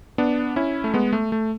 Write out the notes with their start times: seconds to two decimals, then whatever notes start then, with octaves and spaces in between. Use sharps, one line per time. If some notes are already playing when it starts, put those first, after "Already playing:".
0.18 B3 D4
0.56 C#4 E4
0.84 A3
0.94 G#3 B3
1.13 A3
1.32 A3